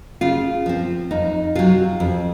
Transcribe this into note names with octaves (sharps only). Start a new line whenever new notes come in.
C#3 F4
F3 C4
F2 D#4
C3 F#3 F4
F2